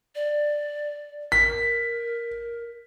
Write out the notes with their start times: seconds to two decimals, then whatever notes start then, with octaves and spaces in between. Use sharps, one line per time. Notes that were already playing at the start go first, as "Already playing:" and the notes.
0.15 D5
1.32 A#4 B6